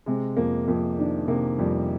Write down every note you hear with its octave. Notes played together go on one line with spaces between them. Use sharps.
C3 G#3
F2 A#3
F2 A#3
D#3 D4
C3 A#3
F2 G3